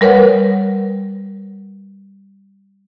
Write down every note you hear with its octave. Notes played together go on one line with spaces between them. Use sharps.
G3 A#4 B4 C#5 F#5